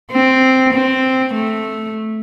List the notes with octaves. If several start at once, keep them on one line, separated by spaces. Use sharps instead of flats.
C4
C4
A3